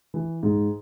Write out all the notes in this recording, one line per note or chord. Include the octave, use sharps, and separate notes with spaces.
E3
G#2